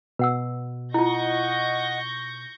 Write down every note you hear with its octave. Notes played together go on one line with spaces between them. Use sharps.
B2 B4 F#5 E6
E4 F4 D#5 F#5 C#6 G6 A#6